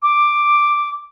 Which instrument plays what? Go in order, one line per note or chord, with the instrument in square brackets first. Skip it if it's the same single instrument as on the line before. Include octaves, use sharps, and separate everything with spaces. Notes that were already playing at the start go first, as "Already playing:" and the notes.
[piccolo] D6